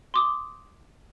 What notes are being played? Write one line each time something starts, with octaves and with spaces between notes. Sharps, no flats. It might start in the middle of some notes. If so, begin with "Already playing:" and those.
C6 D6 D#6